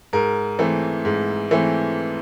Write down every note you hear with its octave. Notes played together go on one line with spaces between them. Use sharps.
G#2 A#4
E3 A3 C4
G#2
E3 A3 C4